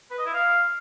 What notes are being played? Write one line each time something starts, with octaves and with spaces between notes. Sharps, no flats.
B4
D#5
E4
F5